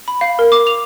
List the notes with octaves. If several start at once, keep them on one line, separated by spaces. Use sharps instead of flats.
B5
F5
A#4
D6
F7